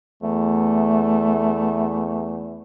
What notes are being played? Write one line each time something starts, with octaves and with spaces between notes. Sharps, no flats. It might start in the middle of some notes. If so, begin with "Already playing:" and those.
E2 A3